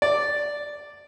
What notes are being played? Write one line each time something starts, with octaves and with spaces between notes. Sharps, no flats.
D5